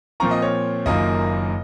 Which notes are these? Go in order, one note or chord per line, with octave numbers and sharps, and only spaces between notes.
A#2 F3 C4 F4 A#5 C#6
D#5
C#5
F#1 F#2 D#3 A#3 F4 D#5